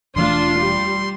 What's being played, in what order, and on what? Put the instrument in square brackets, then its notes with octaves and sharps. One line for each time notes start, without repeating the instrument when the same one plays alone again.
[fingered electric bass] E1 E3 A3 [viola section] D4 F4 [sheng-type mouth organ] C6
[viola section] G3